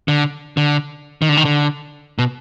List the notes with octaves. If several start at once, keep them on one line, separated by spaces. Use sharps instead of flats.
D3
D3
D#3
D3
D#3
D3
B2